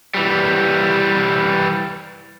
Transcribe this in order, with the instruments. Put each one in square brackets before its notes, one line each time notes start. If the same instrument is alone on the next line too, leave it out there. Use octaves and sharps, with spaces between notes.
[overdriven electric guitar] E3 G3